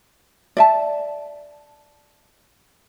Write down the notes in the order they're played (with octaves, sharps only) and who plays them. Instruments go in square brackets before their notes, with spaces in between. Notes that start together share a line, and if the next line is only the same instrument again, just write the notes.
[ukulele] D5 E5 A5